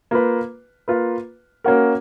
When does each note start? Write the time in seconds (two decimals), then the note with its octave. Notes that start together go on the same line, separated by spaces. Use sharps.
0.11 A#3 F4 B4
0.88 A#3 F4 B4
1.64 A#3 C#4 F#4 A#4